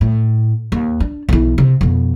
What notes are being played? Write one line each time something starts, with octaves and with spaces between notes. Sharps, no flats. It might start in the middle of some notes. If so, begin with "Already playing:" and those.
A2
D#2
D4
B1 E3
C3
F2 B2